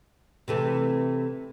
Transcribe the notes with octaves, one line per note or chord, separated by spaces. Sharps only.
C3 E3 A3